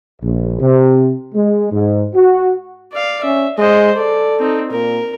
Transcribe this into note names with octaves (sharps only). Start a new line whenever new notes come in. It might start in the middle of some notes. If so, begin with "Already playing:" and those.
A#1
C3
G#3
G#2
F#4
D5 F5
C#4 E5
G#3 C5 D#5
A4 D5
C4 D#4
A#2 A#4